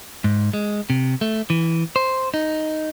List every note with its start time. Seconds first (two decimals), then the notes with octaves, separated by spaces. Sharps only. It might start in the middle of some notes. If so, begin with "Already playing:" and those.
0.24 G#2
0.53 G#3
0.90 C3
1.21 A3
1.50 E3
1.96 C5
2.34 D#4